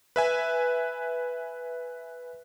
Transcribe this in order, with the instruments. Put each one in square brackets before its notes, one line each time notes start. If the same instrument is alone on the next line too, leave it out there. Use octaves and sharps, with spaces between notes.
[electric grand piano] B4 E5 G#5